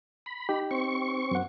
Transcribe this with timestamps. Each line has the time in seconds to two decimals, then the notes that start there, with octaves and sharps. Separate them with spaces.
0.26 B5
0.49 D#4 G4
0.71 C4 C#6
1.31 F#2 F#5